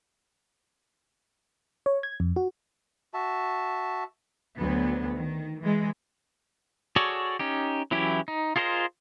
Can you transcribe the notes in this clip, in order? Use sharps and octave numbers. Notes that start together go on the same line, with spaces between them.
C#5
G#6
F2
F#4
F#4 E5 A5
D2 F#3 B3
D#3
E3 G#3
F#4 G#4 A4 C#5 D5
C#4 D#4 G4
E3 F#3 C#4 E4 G4
D#4
F4 G#4 A#4 C5 D#5